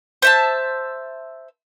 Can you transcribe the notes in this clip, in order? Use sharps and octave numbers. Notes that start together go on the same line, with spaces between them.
C5 E5 A5